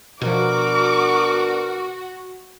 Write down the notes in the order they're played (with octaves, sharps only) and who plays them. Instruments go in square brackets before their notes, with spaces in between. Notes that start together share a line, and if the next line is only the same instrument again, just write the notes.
[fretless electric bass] B2 F3 [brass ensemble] B3 D4 A#4 [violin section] F#4 [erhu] D6